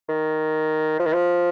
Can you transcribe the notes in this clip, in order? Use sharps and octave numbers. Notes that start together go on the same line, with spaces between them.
D#3
F3
D#3
F3